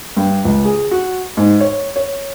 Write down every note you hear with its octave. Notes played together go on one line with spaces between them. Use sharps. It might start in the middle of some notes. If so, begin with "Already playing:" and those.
G2
C#2
G#4
F#4
G#2
C#5
C#5